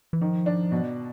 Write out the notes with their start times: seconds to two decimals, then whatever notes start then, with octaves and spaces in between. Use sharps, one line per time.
0.13 E3
0.21 D#3 F3
0.46 D4
0.71 B2